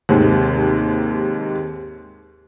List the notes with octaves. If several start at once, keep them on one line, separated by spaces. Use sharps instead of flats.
D#2 G#2 C3